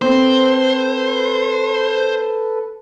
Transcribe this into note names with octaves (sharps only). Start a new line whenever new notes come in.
C4 A4 B4 C5